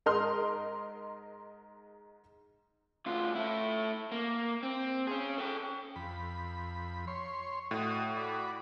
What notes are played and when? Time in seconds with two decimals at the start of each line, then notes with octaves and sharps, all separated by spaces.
0.06 G#2 A#4 D#5 C6 F6
3.06 D2 F4
3.35 A3 E4
4.12 A#3
4.63 C4
5.07 C#4 G#4
5.38 A4 G5
5.96 F2 B5
7.07 C#5 C6
7.71 A2 F#4 D#5 D#6
8.17 F#4 D5 B5